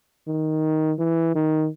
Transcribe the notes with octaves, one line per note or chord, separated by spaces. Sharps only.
D#3
E3
D#3